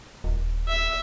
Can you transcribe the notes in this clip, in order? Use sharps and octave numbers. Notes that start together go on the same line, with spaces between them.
D#1
E5